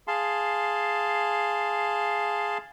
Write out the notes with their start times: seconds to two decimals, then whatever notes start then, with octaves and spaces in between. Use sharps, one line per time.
0.08 G#4 F5 A5 C6